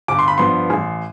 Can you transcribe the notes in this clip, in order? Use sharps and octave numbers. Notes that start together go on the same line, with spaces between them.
G1 D6
C6
B5
G2 F3 B3 C6
A1